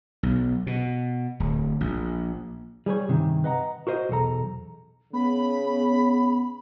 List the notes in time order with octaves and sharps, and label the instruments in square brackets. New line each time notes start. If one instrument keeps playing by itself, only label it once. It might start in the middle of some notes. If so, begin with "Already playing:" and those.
[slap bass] B1
B2
D1
A#1
[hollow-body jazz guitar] G3 G#4 B4 C#5
G2 C3 D#3
B4 D#5 F#5 A#5
F#4 A#4 C5 D#5
B1 E2 A4 A#5
[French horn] C#3 [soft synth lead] B3 [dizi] B5